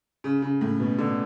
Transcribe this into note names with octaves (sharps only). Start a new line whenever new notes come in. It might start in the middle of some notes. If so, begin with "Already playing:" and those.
C#3
C#3
A2
B2
D3